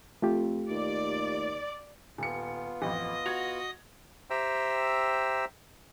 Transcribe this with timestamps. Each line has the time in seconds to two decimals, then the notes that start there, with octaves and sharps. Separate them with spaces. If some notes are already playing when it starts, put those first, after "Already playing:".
0.22 F2 A3 F4 G4
0.70 D#2 D5
2.18 D#1 B3 F4 C#7
2.82 A1 F2 D#5 D#6
3.26 F#4 G#6 F7
4.30 G4 C5 E5 G5 A#5 E6